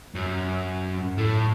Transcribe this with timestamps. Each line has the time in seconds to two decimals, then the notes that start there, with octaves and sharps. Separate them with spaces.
0.15 F#2
1.18 A2 A3